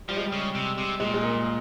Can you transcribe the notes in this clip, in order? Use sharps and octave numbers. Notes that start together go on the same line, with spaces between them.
F3 G3
G#3
G3
C#3
C3
C3
A#2 G#3
G#3
A#3